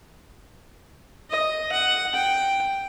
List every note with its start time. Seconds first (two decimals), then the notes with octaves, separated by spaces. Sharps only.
1.30 D#5
1.72 F#5
2.14 G5